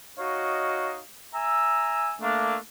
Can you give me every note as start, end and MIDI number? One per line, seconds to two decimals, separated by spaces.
0.19 0.99 63
0.19 0.99 66
0.19 0.99 73
0.19 0.99 75
0.19 0.99 77
1.34 2.15 76
1.34 2.15 80
1.34 2.15 82
1.34 2.15 88
2.21 2.55 57
2.21 2.55 58
2.21 2.55 62